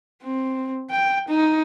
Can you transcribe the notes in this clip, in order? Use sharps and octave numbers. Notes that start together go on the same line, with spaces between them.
C4
G5
D#4